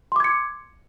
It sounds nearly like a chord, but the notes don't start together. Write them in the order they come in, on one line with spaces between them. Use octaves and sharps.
C6 D6 G#6 C#7